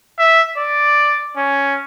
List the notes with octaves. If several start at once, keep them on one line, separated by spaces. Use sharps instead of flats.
E5
D5
C#4